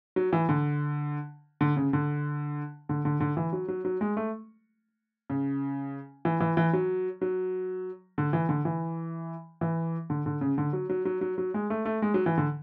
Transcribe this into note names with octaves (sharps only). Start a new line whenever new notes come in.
F#3
E3
D3
D3
C#3
D3
D3
D3
D3
E3
F#3
F#3
F#3
G#3
A3
C#3
E3
E3
E3
F#3
F#3
D3
E3
D3
E3
E3
D3
D3
C#3
D3
F#3
F#3
F#3
F#3
F#3
G#3
A3
A3
G#3
F#3
E3
D3